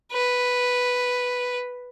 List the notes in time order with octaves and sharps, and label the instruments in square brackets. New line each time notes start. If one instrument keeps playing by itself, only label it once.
[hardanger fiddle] B4